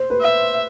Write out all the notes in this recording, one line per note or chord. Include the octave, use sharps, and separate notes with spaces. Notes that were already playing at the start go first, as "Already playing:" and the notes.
Already playing: C5
B4
E5